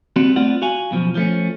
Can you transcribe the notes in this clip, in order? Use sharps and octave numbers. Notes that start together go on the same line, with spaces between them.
G3 B3 C4 F#4
A3 B3 C4 F4 D5 F#5
F#4 F5 G#5
F#2 B2 E3 F3
F3 A3 C#4